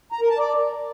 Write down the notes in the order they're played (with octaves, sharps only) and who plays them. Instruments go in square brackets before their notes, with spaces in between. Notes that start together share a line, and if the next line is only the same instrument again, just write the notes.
[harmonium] A#5
A#4
A5
D5